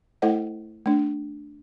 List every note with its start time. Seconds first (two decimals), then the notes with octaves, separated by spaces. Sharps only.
0.22 A3 E4 A4 C5 D#5 F#5
0.86 A3 D4